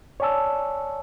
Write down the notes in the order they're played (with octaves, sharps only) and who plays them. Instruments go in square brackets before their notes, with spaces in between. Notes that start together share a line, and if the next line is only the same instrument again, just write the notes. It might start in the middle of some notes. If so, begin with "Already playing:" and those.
[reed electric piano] C#5 D5 G#5 A5 E6